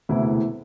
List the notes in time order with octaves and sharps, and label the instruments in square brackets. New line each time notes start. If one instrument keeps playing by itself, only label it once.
[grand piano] E1 D2 C3 E3 E4